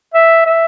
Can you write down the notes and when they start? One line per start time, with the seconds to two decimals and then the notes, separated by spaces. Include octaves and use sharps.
0.14 E5
0.46 E5